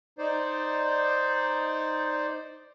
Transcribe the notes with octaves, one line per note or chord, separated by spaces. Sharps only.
D#4 C5 D5